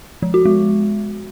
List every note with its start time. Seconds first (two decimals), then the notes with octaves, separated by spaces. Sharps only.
0.22 F3
0.34 F#4
0.45 G#3